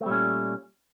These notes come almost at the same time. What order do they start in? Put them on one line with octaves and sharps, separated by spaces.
A3 C4 G3 A#2 C#4